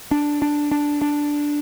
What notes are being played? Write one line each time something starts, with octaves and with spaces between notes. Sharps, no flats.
D4
D4
D4
D4